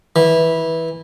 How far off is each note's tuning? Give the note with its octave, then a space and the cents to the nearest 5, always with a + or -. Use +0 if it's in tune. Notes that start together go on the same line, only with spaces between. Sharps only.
E3 -15